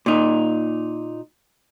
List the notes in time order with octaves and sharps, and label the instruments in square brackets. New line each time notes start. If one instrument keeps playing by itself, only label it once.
[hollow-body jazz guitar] A#2 D#4